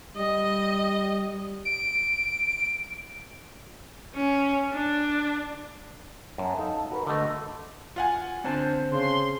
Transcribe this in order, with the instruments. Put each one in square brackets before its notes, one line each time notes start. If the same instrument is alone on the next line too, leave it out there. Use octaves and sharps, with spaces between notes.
[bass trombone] G3 [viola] D#5
[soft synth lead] D7
[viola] C#4
D4
[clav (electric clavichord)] F#2 [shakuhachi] A5
[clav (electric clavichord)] D#4 A4 F5
[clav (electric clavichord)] F#4 A#4 B4 [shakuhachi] B5
[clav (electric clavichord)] D3 A3 [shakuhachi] D#5
[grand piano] F4 F#5 G#5
[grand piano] D3 [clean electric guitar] C4 C5 A5
[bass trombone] C#3 [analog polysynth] C6